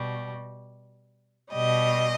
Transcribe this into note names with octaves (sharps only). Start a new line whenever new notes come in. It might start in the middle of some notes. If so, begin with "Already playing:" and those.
Already playing: B2 G3
B2 G3 D#5